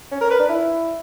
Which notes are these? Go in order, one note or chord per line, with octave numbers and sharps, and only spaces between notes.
C#4
A#4
B4
D4
E4